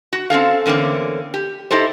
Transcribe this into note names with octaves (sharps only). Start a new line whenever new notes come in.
F#4
C4 C#4 A4 F5
E2 D3 A#3 C4 C#4
G4
D#4 E4 G4 A4 C5